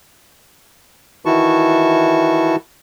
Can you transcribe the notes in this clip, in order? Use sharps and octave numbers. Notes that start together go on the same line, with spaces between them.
D#3 E3 E4 F#4 A5 C#6